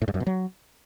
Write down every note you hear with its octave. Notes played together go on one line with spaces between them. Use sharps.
A2
G2
F#2
B2
F#3